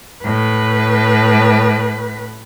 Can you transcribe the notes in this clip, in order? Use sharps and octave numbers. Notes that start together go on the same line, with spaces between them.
A2 B4